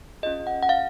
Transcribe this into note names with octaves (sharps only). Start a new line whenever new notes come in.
C#4 F4 G#4 D#5
F#5
F#5
F5